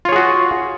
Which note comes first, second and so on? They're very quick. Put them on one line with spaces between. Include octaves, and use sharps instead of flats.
F4 C#5 G#4 F#4